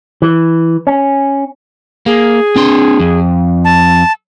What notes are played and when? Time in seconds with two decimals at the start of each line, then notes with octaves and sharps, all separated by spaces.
0.22 E3
0.87 C#4
2.06 A#3 G#4
2.56 C4 D4 C6
3.00 F2
3.65 A5